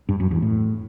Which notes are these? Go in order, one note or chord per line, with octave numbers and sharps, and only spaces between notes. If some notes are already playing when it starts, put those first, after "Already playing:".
G2
F#2
E2
A2